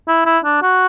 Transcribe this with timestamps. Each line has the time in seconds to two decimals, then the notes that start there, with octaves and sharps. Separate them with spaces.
0.08 E4
0.26 E4
0.45 D4
0.62 F#4